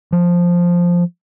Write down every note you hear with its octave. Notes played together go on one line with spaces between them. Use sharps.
F3